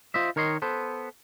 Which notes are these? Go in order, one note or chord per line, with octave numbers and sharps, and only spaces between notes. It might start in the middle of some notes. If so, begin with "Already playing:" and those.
F4 C5 D#5 E5
D#3 A#4 C#5 D#5 C6
B3 A4 C5